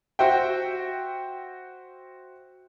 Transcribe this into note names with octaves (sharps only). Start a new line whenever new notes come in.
F#4 C5 E5 G5